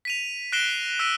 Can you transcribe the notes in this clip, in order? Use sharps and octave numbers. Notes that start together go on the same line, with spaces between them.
B6 D#7 F7
F#6 A#6 C7 D7 E7 G7
E6 F#6 B6 D7 D#7